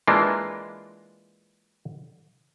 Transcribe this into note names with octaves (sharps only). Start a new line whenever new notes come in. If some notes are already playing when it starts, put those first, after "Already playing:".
E3 G#3 A#3 D4 F4